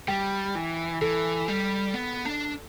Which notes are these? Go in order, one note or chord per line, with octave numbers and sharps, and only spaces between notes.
G3 G5
E3
E3 A4
G3
B3
D4